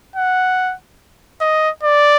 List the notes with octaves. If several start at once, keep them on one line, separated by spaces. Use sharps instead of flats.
F#5
D#5
D5